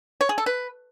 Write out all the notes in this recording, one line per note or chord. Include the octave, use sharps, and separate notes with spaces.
C#5
G#4
A4
B4